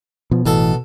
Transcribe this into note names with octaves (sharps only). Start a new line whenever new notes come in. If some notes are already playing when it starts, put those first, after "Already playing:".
B2 F3
A1 B2 E3 A4